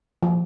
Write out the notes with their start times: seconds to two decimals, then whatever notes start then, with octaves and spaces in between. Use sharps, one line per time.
0.23 F3